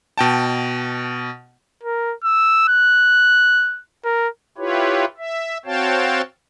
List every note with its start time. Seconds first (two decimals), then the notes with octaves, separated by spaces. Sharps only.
0.18 B2 G5 A5
1.84 A#4
2.24 E6
2.68 F#6
4.04 A#4
4.58 E4 F4 G4 B4 C#5
5.18 E5
5.65 C4 F#4 C#5 F5 G5 A5